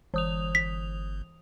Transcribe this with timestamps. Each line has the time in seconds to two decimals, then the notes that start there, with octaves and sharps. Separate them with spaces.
0.14 G1 E3 D#6 F7
0.55 B6